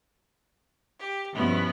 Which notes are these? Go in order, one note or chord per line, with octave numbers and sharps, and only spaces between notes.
G4
G2 B2 F3 B3 C#4 E4